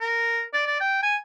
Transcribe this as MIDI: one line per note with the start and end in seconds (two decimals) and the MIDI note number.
0.01 0.41 70
0.53 0.64 74
0.66 0.78 74
0.80 1.00 79
1.02 1.16 80